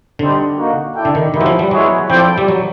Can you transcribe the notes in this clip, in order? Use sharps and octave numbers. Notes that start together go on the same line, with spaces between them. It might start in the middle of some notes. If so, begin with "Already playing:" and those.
D3 G3 C4 D#4
A#3 D#4 F#4
E4 A4 D5 G5
D3
D#3
D#3 G#3 B3 E4 G4 B4
F#3
F3
G3
F#3 G#3 B3 E4 G#4 C#5
F3 C4 E4 A4 D5 G5
G3
F#3